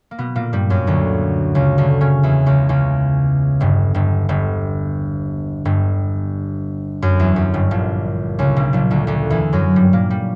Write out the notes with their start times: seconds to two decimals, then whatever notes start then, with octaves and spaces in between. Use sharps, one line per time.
0.11 A#3
0.18 B2 B3
0.35 A#2 A#3
0.53 G2 G3
0.70 F#2 F#3
0.87 D2 D3
1.55 C#2 C#3
1.78 D2 D3
2.01 C#3 C#4
2.23 E2 E3
2.46 C#2 C#3
2.69 C#2 C#3
3.60 G1 G2
3.94 G1 G2
4.29 G1 G2
5.65 G1 G2
7.02 F#2
7.20 E2
7.36 F#2
7.54 G1 G2
7.71 A#1 A#2
8.39 C#2 C#3
8.56 B1 B2
8.73 A#1 A#2
8.90 D2 D3
9.07 D2 D3
9.30 E2 E3
9.53 F#2 F#3
9.76 G2 G3
9.93 A#2 A#3
10.10 G3